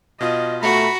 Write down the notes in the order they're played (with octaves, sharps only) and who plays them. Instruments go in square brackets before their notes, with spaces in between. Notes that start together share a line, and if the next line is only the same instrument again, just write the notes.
[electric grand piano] B2 F4 [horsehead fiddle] D#5
[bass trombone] A3 [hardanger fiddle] F#4 [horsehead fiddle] A#5 B5